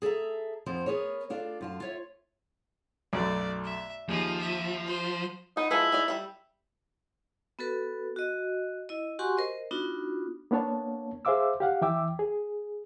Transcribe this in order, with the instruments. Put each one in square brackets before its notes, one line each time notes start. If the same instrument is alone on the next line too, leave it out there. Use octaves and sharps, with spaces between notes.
[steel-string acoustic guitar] G#4 A4 D5 E5 A#5
F2 F3 B3 C5
B3 G#4 A#4 C#5
D4 F4 A4 D5
F#2 F4 A5
F4 C#5 E5
[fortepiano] B1 F#2 A3 [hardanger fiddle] D5
[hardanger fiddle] E5
[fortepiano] D#2 [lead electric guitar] F3 [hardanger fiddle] D#4 G#4
[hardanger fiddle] E5
C5
[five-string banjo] B3 [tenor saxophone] D#4
[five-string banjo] F3 G#3 B4 [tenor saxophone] E4
[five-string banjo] G#3 D#4 D5
G3 E5
[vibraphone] B3 F#4 A4 B4
F#4 D#5
E4 D#5
F#4 G4 F#5 G#5 C6 C#6
A#4 C5 D#5
B3 D4 D#4 F4 F#4
[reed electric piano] A#3 B3 D4 C#5 A5
G#4 C5 E5 F5 D6 E6
G4 F5 F#5
E3 E5 G5 D6 E6
G#4